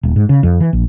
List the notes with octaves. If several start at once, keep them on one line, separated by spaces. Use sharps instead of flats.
D#1
G#2
C#3
F2
E3
A#1